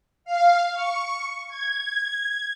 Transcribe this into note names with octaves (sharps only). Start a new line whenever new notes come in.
F5
C#6
G#6